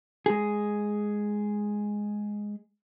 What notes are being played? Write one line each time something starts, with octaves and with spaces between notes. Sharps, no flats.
G#3 G#4